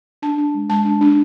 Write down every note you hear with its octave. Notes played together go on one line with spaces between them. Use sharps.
D4 A5
D4
G#3
G#3 A5
D4
D4